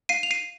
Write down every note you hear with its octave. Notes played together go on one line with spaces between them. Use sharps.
F5 C7 D#7
F7
C7 D#7